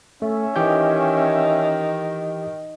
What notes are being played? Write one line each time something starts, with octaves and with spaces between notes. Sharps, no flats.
A3 C#4 E5
D#3 E3 G4 G6